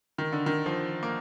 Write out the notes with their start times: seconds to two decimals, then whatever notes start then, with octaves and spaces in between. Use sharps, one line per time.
0.18 D#3
0.32 D3
0.46 D#3
0.66 F3
1.03 A#3